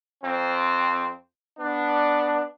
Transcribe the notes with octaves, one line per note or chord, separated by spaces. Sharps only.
F2 C4
B3 D4